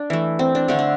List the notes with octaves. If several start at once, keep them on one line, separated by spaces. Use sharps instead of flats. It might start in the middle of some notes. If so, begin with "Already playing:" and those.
Already playing: D4
E3 A3
C4
D4
D3 A3 D4
D4